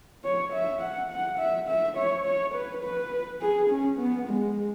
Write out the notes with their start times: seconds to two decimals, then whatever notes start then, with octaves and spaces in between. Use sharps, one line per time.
0.24 C#5
0.53 E5
0.81 F#5
1.10 F#5
1.39 E5
1.68 E5
1.97 C#5
2.26 C#5
2.55 B4
2.84 B4
3.41 G#4
3.70 C#4
3.99 B3
4.28 G#3